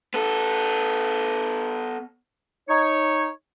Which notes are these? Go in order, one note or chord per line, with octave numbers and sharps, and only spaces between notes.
B3 A4
D#4 C#5